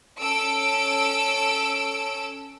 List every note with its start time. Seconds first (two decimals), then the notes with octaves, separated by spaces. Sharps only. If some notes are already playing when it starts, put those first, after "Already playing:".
0.20 C#4 A4 E6 D7